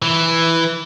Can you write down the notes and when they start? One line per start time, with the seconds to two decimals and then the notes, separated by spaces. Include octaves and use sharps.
0.02 E3